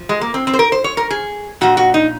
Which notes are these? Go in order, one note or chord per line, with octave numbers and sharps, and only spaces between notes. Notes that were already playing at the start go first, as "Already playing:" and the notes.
Already playing: F3
G#3
A#3
C4
C4
C5
A#4
C5
C#5
A#4
G#4
A#2 F3 F#4
F#4
D#4